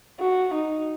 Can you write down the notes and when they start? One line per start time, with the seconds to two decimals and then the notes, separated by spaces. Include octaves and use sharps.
0.20 F#4
0.54 D#4